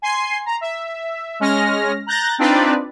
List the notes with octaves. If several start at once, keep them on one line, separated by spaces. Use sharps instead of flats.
G#5 C6 C7
A#5
E5
G#3 C#4 F6 A#6
A#5 F#6 G6 A6 A#6
C4 D4 D#4 F4 B4 D5